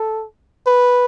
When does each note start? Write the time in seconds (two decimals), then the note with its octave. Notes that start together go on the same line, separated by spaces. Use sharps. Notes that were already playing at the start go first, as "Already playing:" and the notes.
Already playing: A4
0.67 B4